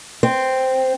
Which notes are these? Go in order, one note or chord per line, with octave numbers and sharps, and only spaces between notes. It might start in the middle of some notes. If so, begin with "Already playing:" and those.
C4